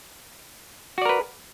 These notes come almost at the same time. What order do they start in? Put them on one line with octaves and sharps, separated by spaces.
F#4 D5 A#4 B4